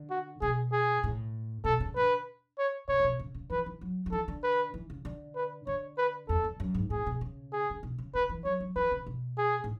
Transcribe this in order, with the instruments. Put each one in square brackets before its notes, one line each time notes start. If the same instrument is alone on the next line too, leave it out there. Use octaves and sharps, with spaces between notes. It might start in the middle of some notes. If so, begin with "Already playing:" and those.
Already playing: [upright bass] D3
[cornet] F#4
[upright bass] B2 [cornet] G#4
[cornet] G#4
[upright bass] A2
[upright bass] B2 [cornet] A4
[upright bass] C#3
[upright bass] D3 [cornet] B4
[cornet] C#5
[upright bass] B2 [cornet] C#5
[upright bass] C#3
B2
C#3
C#3
[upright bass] E3 [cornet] B4
[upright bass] E3
F#3
F#3
[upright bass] E3 [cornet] A4
[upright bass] D3
[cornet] B4
[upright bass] E3
C#3
D3
[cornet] B4
[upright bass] D3 [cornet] C#5
[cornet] B4
[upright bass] E2 [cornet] A4
[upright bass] E2
F#2
G#2
[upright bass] A2 [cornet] G#4
[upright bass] B2
C#3
[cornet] G#4
[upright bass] C#3
B2
C#3
[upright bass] C#3 [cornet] B4
[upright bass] E3
[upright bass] F#3 [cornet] C#5
[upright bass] F#3
[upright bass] E3 [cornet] B4
[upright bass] C#3
B2
[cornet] G#4
[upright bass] A2